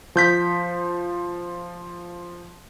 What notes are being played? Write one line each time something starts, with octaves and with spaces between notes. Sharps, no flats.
F3 G6 B6